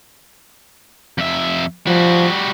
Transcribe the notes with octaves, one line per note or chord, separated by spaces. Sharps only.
F2 E5
F3 G3 F#4